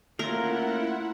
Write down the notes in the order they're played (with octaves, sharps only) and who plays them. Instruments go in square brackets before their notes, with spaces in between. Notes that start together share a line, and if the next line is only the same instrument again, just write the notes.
[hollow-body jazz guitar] A3 [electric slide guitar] A#3 C#4 F4 [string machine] E4 F#5 [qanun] A#4